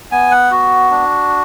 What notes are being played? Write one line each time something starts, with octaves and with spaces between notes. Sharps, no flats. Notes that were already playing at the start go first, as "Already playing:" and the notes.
B3 G#5
F#5
F#4
D4